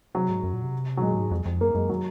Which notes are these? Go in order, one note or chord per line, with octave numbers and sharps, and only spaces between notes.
C3 F#3
G#2
F#2
A#2
C3
F#3
A#2 G#3
G#2
F2
F2
F#2 A#3
F#2 G#3
F#3